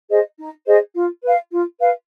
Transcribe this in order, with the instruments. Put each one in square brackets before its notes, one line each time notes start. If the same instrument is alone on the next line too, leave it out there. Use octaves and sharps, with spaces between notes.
[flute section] G#4 C5 D#5
D#4
G#4 C5 D#5
F4
B4 F5
F4
B4 F5